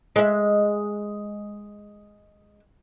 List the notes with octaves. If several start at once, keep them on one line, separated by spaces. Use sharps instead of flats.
G#3 E5